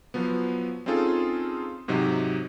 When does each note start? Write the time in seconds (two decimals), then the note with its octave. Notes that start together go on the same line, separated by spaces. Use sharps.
0.14 F3 F#3 B3
0.86 C4 C#4 D#4 F4 G#4 A4
1.88 G#2 C3 F#3 D#4